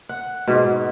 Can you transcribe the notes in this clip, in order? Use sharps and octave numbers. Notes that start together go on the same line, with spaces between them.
F#5
G#2 B2